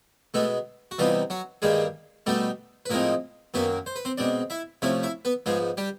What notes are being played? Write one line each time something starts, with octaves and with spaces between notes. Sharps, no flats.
B2 G#3 A3 B3 A4
F#4
C3 E3 G3 B3 D#4 F4
F#3 F#4
G2 D#3 G3 G#3 A#3 G#4
B2 G3 A3 B3 D#4 A4
B4
A2 F3 G#3 A#3 C4 D#4 A#4
F#2 D#3 F#3 A#3 B3 B4
C5
B4
C4 C5
B2 G#3 C4 D4 D5
E4 E5
C3 F3 A3 C#4 E4 E5
E4 E5
B3 B4
G#2 F3 G#3 B3 G#4
G3 G4